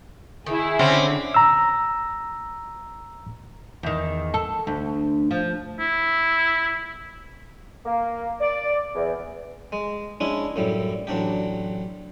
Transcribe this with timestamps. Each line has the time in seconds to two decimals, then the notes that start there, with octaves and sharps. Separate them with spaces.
0.46 D#3 E4 G#4
0.79 D3 C4 C#4
1.34 A#5 E6
3.83 E2 D#3
4.34 A4
4.67 D2
5.31 F3
5.79 E4
7.86 A#3
8.41 D5
8.95 E2
9.72 G#3
10.20 G#3 C#4 D4 E4
10.56 F#2 A2 G3
11.07 A1 F#3 D4 G4